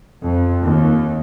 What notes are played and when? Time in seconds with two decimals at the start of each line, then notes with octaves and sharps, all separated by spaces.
0.22 F2
0.64 D#2